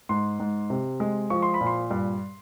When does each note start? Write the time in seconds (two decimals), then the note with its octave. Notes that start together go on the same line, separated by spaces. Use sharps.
0.09 G#2 C6
0.40 G#2
0.70 C3
1.00 G#3
1.30 F3 C#6
1.42 C6
1.54 B5
1.61 A#2
1.67 C6
1.91 G2